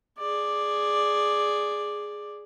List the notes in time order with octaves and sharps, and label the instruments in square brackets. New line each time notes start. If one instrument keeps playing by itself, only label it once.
[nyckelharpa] G#4 D5